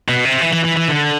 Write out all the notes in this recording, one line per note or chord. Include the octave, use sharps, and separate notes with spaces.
B2
C3
E3
E3
E3
E3
D3